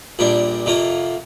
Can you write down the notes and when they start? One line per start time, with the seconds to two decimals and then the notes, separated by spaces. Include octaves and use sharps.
0.19 A#1 A#2 G3 D4
0.66 F2 C3 A#3 F4